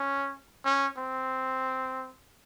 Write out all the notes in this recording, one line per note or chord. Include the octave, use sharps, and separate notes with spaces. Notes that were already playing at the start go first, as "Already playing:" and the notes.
Already playing: C#4
C#4
C4